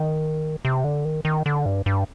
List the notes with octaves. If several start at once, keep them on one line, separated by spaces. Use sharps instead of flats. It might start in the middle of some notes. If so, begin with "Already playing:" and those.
Already playing: D#3
C3
D3
D#3
D#3
D3
G2
G2